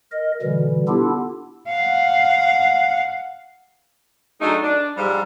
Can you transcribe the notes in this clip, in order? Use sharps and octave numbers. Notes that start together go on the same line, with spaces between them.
A#4 D#5
B2 D3 E3 G3
B3 D4 E4 F4 G4 A4
F5 F#5
F#3 G#3 A3 D4 D#4
D4
G#2 F3 G3